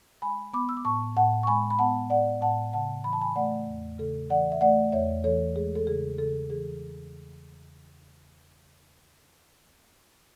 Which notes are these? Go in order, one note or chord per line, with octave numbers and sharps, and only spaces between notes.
G#3 G#5 B5
B3 B5 D6
E6
D6
A2 A5 C#6
A2 F#5 A5
C#6
G#3 G#5 B5
B5
B3 F#5 A5
A2 D5 F#5
A2 F#5 A5
C#3 F#5 A5
E3 B5
A5
G#5 B5
A3 D5 F#5
E2
C#3 A4
E3 D5 F#5
E5
A3 D5 F#5
E2 C#5 E5
E3 A4 C#5
G#3 G#4
A4
C#3 G#4
C#3 A4
E3 G#4